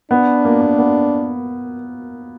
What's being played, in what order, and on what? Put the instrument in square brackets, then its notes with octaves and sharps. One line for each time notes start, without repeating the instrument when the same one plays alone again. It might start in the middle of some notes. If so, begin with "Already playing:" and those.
[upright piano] B3 [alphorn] D4
[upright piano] A#3
A#3
B3